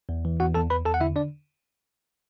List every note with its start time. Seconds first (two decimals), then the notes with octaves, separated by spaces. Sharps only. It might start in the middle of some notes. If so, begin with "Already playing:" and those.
0.09 E2
0.25 E3
0.40 E2 F#4 F#5
0.54 E2 A4 A5
0.70 E2 B4 B5
0.85 E2 A4 A5
0.94 F#5
1.00 D3 E4 E5
1.16 D4 D5